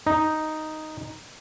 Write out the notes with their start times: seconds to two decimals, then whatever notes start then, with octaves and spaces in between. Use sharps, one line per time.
0.06 D#4